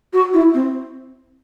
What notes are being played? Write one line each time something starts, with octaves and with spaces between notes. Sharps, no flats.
F#4
E4
C4